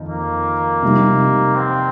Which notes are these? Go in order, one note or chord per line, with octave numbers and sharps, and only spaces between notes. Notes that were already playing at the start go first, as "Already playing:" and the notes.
Already playing: F2 D#3 D#4
A#3
C3 G3 D#4
C4